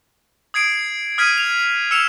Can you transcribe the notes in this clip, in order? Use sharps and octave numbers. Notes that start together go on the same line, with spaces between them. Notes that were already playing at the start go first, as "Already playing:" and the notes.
D#6 G#6 C7 D7
D#6 F6 G#6 B6 D7 D#7
F7
E6 C#7 E7 F7